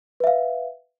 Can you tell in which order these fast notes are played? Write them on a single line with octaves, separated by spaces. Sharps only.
B4 E5 F5